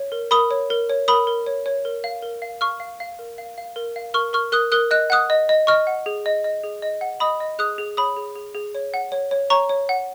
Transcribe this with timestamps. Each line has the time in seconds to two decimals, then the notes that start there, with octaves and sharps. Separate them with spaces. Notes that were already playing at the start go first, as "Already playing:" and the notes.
Already playing: C#5
0.12 A#4
0.31 A#4 B5 D#6
0.51 C#5
0.70 A#4
0.90 C#5
1.08 A#4 B5 D#6
1.27 A#4
1.46 C#5
1.66 C#5
1.85 A#4
2.04 F5
2.22 A#4
2.42 F5
2.61 F5 C#6 F6
2.80 F5
3.00 F5
3.19 A#4
3.38 F5
3.58 F5
3.76 A#4
3.96 F5
4.14 A#4 C#6 F6
4.33 A#4 C#6 F6
4.52 A#4 D#6 F#6
4.72 A#4 D#6 F#6
4.91 D#5 F#6
5.10 F#5 D#6 F#6
5.30 D#5
5.49 D#5
5.67 D#5 C#6 F6
5.87 F#5
6.06 G#4
6.26 D#5
6.44 D#5
6.64 G#4
6.82 D#5
7.01 F#5
7.20 D#5 B5 D#6
7.40 D#5
7.59 G#4 D#6 F#6
7.78 G#4
7.97 C#5 B5 D#6
8.17 G#4
8.35 G#4
8.55 G#4
8.75 C#5
8.94 F#5
9.12 C#5
9.31 C#5
9.50 C#5 A#5 C#6
9.69 C#5
9.89 F#5